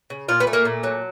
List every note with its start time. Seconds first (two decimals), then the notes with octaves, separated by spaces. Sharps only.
0.10 C#3
0.29 A#2 F4
0.40 B3
0.47 A3
0.53 A#3
0.65 A#2
0.83 F#3